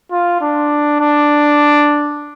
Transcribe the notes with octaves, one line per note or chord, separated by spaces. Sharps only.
F4
D4
D4